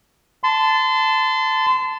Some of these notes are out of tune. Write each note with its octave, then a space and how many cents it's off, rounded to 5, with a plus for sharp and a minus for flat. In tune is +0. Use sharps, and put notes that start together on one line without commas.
A5 +0 C6 -30